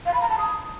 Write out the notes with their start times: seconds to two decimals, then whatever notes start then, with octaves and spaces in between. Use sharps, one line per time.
0.06 F5
0.14 B5
0.22 A#5
0.30 A5
0.38 D#6